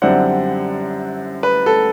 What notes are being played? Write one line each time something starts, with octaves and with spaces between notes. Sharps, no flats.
F#2 D3 G3 C4 E4 F#5
B4
A4